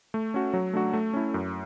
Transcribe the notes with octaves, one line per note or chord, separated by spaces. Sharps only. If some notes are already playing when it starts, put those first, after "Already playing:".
A3
C#4 F#4
F#3
A3 D4 F#4
A3
C#4 E4
F#2